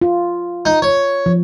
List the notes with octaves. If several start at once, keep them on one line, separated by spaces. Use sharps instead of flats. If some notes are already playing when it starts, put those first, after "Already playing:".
F4
D#4
C#5
F3